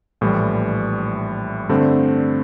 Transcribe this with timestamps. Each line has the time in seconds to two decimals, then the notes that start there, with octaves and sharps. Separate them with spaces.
0.21 A#1 A2 E3 G3
1.69 G2 D3 A3 C4